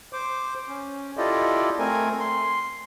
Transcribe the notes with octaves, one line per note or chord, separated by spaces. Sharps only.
C5 D6
C#4
E4 F4 G4 A4 D5 D#5
A3 C4 A#4 G#5
C6